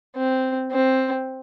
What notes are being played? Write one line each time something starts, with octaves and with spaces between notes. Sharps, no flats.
C4
C4